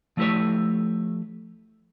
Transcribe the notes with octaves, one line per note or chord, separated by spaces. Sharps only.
F3 A3 E4 G4 B4 C#5